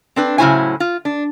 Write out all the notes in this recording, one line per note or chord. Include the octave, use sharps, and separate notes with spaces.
C4 D4 B4
A2 C#3 F#3 E4 C5 G#5
F4
D4